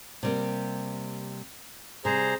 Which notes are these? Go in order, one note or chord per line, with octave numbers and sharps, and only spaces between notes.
C3 G3 A#3
C3 G3 G#4 C5 A#5